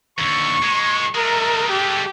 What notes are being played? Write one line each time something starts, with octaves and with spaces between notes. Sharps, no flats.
D#2 D3 C#6
A#2 G#3
G#3 A3 A#4
G4